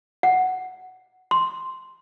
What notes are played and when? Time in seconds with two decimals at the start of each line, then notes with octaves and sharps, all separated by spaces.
0.23 F#5
1.31 C6